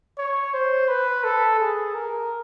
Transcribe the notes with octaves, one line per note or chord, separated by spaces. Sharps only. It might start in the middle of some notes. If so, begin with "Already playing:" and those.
C#5
C5
B4
A4
G#4
A#4